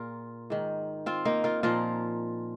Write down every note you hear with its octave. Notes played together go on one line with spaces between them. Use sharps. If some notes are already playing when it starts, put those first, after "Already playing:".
Already playing: A#2 F4 G#4 A#4
G#2 D#3
C4 F4
A#3 D#4
F4 A#4
A#2 F3 F4 A#4